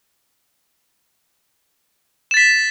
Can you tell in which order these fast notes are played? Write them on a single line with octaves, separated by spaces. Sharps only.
E7 A6 B6